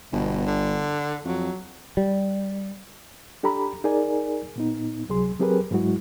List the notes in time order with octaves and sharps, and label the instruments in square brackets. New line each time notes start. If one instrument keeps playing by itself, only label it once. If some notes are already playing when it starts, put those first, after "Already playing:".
[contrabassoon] G1 [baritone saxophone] B2
[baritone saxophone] D3
[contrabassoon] F2 [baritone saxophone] F#3
[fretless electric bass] G3
[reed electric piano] D4 G4 A4 A#5 B5
D#4 G#4 A#4 D5 G#5
A#2 B3 D#4
C#2 C3 F#3 G#4 C6
F#3 C4 G4 G#4 A#4 B4
G#2 F#3 G#3 E4 F#4